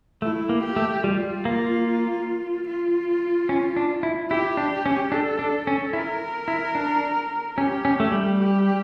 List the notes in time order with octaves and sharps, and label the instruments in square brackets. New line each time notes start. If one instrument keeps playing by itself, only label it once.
[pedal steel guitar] A3 [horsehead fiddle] E4
[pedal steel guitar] A#3
[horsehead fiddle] G4
[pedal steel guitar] A3
[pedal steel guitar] G3 [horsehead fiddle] F4
[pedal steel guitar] A#3
[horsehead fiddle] F4
[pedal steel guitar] C#4
D4
E4
[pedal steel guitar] E4 [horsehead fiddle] G4
[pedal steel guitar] D4
C#4
[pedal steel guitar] D4 [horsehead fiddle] A4
[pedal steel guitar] D4
C#4
[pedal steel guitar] E4 [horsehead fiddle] A#4
[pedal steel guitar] E4
D4
[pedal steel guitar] C#4 [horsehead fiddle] G4
[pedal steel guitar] C#4
A3
G3
[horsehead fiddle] G4